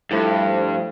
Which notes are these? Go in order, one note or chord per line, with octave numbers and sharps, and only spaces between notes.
G2 F3 A3 E4 A4 C5